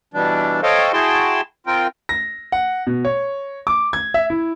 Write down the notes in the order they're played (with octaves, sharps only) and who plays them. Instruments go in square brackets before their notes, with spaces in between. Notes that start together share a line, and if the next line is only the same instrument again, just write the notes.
[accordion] B2 E3 G3 D4
A4 C5 C#5 D#5 F5 G5
E4 F#4 G#4 G5 A5 C6
C4 F4 A#4 G5
[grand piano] A#6
F#5
B2
C#5
D6
G#6
E5
E4